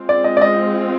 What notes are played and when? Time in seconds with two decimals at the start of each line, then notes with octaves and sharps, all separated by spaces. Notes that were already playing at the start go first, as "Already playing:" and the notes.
Already playing: G#3 C4 F4
0.09 D5
0.24 D#5
0.37 D5
0.41 D#5